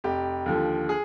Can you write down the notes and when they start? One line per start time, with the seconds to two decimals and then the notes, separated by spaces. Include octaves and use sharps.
0.04 F1 G4
0.46 D#2 D3 F3
0.89 G#4